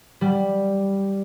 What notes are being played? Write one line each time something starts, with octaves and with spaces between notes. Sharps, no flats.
G3